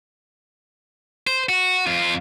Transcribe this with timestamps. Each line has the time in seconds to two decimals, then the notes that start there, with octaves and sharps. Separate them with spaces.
1.27 C5
1.49 F#4
1.87 F2 F4